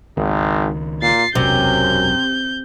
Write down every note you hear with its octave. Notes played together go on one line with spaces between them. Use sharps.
G#1 C#2 D#3
A#2 A6 C7
E1 B1 F#2 C3 F#3 G6